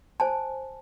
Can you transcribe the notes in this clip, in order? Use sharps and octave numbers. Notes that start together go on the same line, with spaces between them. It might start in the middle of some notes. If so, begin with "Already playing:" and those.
C5 G#5 A5